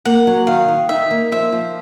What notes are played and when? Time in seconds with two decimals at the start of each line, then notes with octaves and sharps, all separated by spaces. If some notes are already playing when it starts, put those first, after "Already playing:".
0.05 A#3 F#5
0.27 F#3
0.47 D#3 F5
0.68 D#3
0.89 D#4 E5
1.11 A#3
1.32 F3 E5
1.52 F3